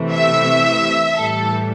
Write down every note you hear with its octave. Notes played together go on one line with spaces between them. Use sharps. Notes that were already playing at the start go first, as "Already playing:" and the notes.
Already playing: C3 E3 A3
E5
A2 E3 G3 A4